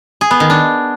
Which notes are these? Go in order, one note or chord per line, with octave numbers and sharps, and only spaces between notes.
G#4
B3
D#3
D4